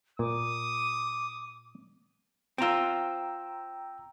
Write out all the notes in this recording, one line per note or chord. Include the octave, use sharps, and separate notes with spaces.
A#2 D6 D#6
C4 F4 G5 A#5 E6